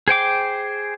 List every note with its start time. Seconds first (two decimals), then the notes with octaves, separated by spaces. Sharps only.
0.08 G#4 C5 G5 D6